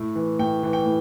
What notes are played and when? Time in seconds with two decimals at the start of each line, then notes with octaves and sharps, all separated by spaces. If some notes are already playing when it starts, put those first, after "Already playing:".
Already playing: A2
0.15 E3
0.39 A2 G5
0.63 E3
0.73 G5
0.86 A2